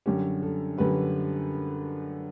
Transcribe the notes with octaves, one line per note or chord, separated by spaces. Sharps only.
F#2 D3 G3 C#4 G4
A4
F#2 D3 G3 C#4 B4